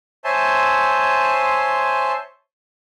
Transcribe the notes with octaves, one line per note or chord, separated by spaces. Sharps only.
C5 C#5 E5 G#5 A5 C6